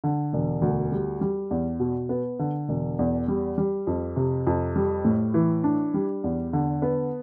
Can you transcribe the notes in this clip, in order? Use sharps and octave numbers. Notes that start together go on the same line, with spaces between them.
D3
E1
D2
G3
G3
E2
B2
B3
D3
E1
E2
G3
G3
F2
C3
F2
G3
A2
E3
D4
G3
E2
D3
B3